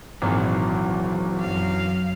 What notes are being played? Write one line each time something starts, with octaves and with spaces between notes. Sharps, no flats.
G#1 A#2 E3 F#3
F#2 F5